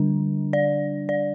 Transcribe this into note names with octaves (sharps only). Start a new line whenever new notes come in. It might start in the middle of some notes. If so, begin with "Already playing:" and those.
Already playing: D3 G3 D4
D5
D5